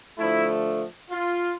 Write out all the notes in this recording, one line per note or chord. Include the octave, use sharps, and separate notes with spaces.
D3 F3 A3 E4
F4